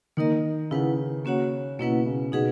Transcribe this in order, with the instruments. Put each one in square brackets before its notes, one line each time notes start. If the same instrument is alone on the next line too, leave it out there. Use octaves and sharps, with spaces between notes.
[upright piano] D#3 [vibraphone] A#3 D#4 A#4 D#5
[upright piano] C#3 [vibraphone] E4 B4 F#5
[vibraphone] A#3 C#4 F#4 C#5 F#5
[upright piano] B2 [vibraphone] A#3 C#4 E4 B4 F#5
[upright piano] C#3
[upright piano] B2 [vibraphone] D#4 G#4 B4 F#5